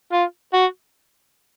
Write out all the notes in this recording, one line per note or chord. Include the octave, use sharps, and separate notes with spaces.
F4
F#4